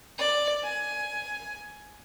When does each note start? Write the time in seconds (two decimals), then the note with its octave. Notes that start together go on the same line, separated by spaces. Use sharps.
0.18 D5
0.63 G#5